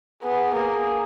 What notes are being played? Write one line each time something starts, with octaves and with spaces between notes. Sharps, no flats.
B3 G#4
A#3 G#4